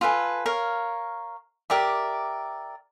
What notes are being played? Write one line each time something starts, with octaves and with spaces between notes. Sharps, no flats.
F4 A4 B4 G#5
A#4 C#5 F5
G4 A#4 D5 E5